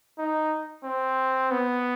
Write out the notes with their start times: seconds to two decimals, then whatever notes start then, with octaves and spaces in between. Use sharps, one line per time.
0.19 D#4
0.84 C4
1.52 B3